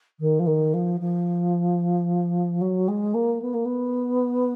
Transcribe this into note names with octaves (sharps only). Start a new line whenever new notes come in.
D#3
F3
D#3
F3
F3
F#3
G#3
A#3
B3
A#3
B3